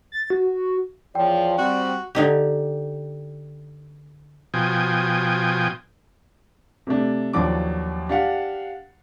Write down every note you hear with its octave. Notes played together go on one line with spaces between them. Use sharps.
A6
F#4
E2 F3 C#5 D5 G5
G3 C4 F#4
D3 D#4 G4
B2 F3 G5 G#5 D#6
C3 A3 D4
D#2 F3 F#3 D4 D6
D4 G4 F5 F#5